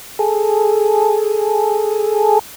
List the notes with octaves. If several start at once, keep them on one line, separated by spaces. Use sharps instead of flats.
G#4 A4